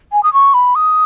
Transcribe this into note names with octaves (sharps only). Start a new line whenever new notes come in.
G#5
D#6
C#6
B5
D#6